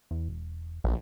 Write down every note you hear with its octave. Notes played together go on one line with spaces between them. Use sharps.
E2
E1
A#1